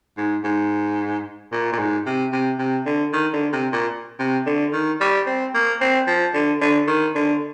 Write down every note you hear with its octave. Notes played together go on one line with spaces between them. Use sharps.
G#2
G#2
A#2
A#2
G#2
C3
C3
C3
D3
D#3
D3
C3
A#2
C3
D3
D#3
G3
C4
A#3
C4
F3
D3
D3
D#3
D3